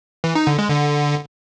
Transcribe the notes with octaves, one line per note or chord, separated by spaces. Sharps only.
E3
D#4
D3
G#3
D3